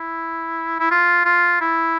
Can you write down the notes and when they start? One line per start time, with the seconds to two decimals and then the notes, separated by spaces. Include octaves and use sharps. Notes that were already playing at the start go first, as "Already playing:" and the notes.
Already playing: E4
0.80 E4
0.91 F4
1.25 F4
1.61 E4